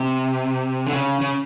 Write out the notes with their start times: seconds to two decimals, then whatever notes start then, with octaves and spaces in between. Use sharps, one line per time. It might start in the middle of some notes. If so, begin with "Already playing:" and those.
Already playing: C3
0.87 D3
0.93 C#3
1.21 C#3